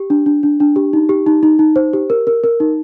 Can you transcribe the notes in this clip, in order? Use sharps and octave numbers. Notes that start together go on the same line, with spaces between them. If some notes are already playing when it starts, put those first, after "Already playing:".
Already playing: G4
D4
D4
D4
D4
G4
D#4
G4
D#4
D#4
D#4
C5
G4
A#4
A#4
A#4
D#4